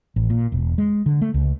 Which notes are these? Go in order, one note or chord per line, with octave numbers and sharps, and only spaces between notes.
A1
A#2
E1
G#3
D3
A3
C#2